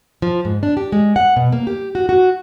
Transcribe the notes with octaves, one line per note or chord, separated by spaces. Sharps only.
F3
G#2
D4
G4
G#3
F#5
B2
A#3
G4
F#4
F#4